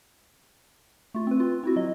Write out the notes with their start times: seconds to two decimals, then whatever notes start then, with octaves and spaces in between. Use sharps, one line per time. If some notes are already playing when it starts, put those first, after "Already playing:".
1.14 A3 F4
1.27 C4 B4
1.40 F4
1.63 C4 E4 F#4
1.76 F#3 D#5